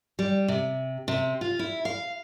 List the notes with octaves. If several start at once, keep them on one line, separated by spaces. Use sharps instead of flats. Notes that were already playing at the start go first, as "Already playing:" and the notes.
G3
C3
C3
F4
E4
F5